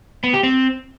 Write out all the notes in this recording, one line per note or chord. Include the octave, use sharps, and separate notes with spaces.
B3
G4
C4